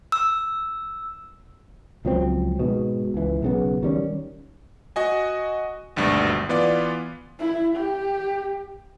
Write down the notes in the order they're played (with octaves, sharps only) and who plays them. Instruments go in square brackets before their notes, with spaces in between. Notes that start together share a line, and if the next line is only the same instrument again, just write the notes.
[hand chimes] E6
[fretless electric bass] C#2 F3 F#3 C4
G#2 B2
C#2 E3
B1 C#3 B3
D#3 G3 C#4
[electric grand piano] F#4 D#5 G#5
G#1 D2 G2 B2
E3 B3 F4 D5
[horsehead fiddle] E4
G4